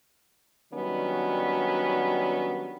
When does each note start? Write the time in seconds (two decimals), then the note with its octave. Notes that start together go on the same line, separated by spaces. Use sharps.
0.72 D#3 F#3 G3 B3 C#4 D4